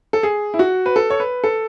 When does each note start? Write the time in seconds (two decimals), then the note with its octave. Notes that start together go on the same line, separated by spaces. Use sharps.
0.13 A4
0.23 G#4
0.54 E4
0.59 F#4
0.86 B4
0.96 A4
1.10 C#5
1.20 B4
1.44 A4